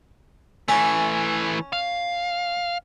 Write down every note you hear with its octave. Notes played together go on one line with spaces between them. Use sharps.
E3 A3 C#4
F5